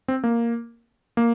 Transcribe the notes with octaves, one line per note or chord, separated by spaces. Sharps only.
C4
A#3
A#3